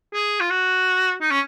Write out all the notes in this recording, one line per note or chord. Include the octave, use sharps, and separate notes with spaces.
G#4
F4
F#4
D#4
C#4